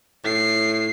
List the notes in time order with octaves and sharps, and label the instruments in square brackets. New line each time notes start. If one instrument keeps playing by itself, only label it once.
[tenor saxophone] A2 [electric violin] C7